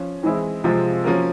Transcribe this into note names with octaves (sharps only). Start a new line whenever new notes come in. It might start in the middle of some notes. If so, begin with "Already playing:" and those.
Already playing: F3 C#4 F4
E3 G#3 C4 E4 G#4
C3 F3 G#3 C4 F4
F3 A#3 C#4 F#4 A#4